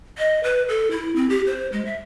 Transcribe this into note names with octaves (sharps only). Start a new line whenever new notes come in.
D#5
B4
A4
E4
C4
G4
C5
G#3
E5